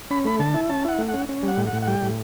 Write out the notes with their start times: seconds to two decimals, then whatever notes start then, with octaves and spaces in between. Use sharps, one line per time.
0.11 C#4 B5
0.25 A3 B5
0.39 D3 A5
0.54 E4
0.69 C#4 A5
0.85 E4 F#5
0.98 A3
1.08 F#5
1.14 C#4
1.29 C#4
1.43 G3
1.48 F#5
1.57 A2
1.67 F#5
1.73 A2
1.82 F#5
1.87 G3 G5
2.02 A2